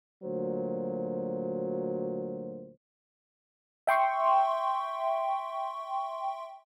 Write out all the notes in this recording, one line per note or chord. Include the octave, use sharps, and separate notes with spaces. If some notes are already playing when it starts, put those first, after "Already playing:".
D2 A#2 F#3 C5
E5 G5 C6 C#6